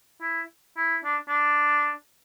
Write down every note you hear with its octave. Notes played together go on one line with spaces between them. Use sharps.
E4
E4
D4
D4